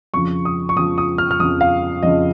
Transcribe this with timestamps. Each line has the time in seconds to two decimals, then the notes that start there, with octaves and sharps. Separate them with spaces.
0.13 F2 C#3 F3 C#6
0.45 D#6
0.69 C#6
0.76 F2 C#3 F3 D#6
0.98 D#6
1.18 F6
1.31 F6
1.39 F2 C#3 F3 D#6
1.61 F5
2.03 F2 C#3 F3 D#5